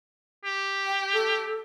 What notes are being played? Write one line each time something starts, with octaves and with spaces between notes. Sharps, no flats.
G4
G5
A4